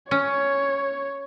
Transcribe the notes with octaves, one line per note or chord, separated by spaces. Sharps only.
C#4 C#5